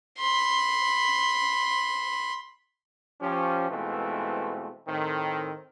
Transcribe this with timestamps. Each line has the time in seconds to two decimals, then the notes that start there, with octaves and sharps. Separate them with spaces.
0.18 B5 C6
3.21 F3 C#4 G4
3.70 B2 E3 G#3 A3 C4 F4
4.88 A2 D#3 C4